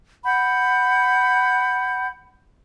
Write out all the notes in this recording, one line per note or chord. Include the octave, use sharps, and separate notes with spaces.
F#5 B5 G6